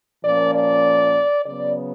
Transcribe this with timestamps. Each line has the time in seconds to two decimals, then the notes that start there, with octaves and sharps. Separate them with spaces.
0.24 A#2 F3 A#3 C#4 D5
0.54 D5
1.46 C#3 F#3 B3 D5